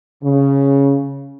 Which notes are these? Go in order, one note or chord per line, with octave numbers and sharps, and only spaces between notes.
C#3